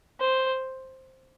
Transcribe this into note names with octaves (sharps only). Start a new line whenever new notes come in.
C5